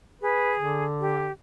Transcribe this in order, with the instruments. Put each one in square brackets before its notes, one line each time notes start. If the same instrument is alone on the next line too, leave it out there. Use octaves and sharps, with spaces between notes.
[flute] G#4 [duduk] B4
[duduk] D3
[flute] G4